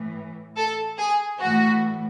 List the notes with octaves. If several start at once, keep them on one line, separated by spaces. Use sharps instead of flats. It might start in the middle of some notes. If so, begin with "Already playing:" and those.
Already playing: A2 E3
A4
G#4
A2 E3 F#4